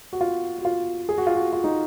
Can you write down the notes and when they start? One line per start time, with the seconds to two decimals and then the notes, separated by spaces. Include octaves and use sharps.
0.13 F#4
0.21 F4
0.58 F#4
0.65 F4
1.09 G#4
1.18 F#4
1.27 F4
1.36 F#4
1.53 F4
1.64 D#4